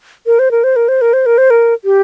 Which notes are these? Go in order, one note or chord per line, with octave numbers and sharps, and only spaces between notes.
A#4
C5
A#4
C5
A#4
C5
A#4
C5
A#4
C5
A#4
G4